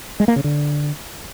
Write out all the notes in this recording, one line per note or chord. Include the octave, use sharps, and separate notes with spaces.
G#3
A#3
C#3
D3